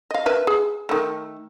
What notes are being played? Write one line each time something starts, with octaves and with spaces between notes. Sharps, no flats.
D#5 F5
A#4 B4 E5
G#4
D#3 A3